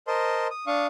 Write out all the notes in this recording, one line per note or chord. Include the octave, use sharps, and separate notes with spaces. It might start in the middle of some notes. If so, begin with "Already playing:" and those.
A#4 C5 D#5 A5 C6
D#6
D4 F5 C#6 D#6